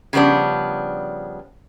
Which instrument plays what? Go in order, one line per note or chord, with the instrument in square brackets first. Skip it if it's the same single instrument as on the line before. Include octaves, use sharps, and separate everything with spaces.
[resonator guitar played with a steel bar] C#3 F3 G3 B3 D4